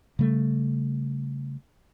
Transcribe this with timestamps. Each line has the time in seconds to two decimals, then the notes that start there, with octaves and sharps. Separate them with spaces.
0.19 C#3 G3 A3